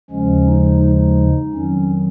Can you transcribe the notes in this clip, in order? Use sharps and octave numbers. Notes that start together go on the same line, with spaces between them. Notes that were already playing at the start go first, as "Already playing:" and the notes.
D#2 C#3 F3 G#3 C#4
D#4
D#4
F2 D#3 F#3 C#4